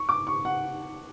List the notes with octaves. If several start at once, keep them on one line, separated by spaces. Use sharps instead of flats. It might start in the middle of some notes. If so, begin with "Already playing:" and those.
Already playing: C#6
D6
C#6
F#5